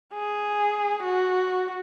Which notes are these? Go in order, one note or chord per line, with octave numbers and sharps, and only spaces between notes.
G#4
F#4